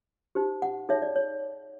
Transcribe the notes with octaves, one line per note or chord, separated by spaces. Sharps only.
D#4 G4 C5
F#5
D#4 G#4 C#5 E5
D5
C#5